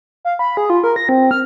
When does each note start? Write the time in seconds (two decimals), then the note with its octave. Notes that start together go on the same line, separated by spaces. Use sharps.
0.25 F5
0.39 B5
0.57 G#4
0.70 F4
0.84 A#4
0.96 A#6
1.09 C4
1.31 F6